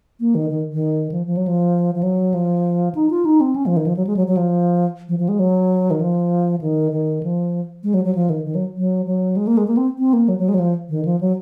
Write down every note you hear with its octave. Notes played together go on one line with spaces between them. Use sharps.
A#3
D#3
D#3
D#3
F3
F3
F#3
F3
F3
F#3
F3
D#4
F4
D#4
C4
C#4
F3
D#3
F3
F#3
G#3
F#3
F#3
F3
F3
F3
G#3
F#3
D#3
F3
D#3
D#3
F3
G#3
F#3
F#3
F3
D#3
D#3
F#3
F#3
F#3
G#3
A#3
G#3
A#3
C4
C4
A#3
F#3
F#3
G#3
F#3
F3
D#3
F3
F#3